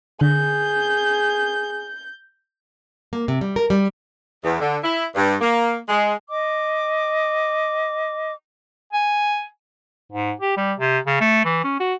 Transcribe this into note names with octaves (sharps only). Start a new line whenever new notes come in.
D3 G#4 G6
A#3
C3
G3
A#4
G3
E2
D3
E4
G2
A#3
G#3
D#5 D6
G#5
G#2
G4
G3
C3
C#3
A3
E3
C#4
F#4